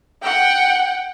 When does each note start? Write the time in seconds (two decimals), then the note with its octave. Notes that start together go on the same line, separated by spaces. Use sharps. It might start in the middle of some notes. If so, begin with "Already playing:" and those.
0.23 F#5 G5